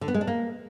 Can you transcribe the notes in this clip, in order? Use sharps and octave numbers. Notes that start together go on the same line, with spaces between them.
D3
B3
G#3
D4
A#3